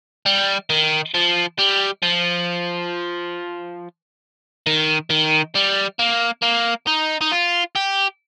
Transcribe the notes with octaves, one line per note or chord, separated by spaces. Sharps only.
G3
D#3
F3
G3
F3
D#3
D#3
G3
A#3
A#3
D#4
D#4
F4
G4